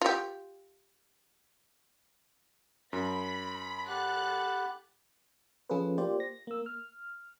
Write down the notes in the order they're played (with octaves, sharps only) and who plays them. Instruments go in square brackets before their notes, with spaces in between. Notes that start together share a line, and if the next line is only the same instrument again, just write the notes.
[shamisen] F4 G4
[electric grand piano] F#2 [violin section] B5 B6
[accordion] G4 F#5 B5 [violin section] A4 F#6 A6
[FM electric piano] F3 C#4 F4 G#4 A4 B4
A#3 F4 G4 C5 D5
A#6
A#3 E6
F6